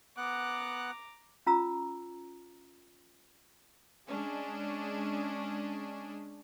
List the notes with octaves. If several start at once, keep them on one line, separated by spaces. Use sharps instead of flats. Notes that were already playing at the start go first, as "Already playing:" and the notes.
B3 F#5 A#5 D6 F#6
C#4 F4 A#5 E6
G#3 C#4 D4 G#4